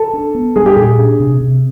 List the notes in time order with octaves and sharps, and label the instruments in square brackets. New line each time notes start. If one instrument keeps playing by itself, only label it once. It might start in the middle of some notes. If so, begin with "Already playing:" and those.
Already playing: [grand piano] A4
[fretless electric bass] D4
B3
[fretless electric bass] G3 [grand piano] G#4
[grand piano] G4
[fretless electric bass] A#2 [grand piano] G#4
[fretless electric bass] D4
C3
C3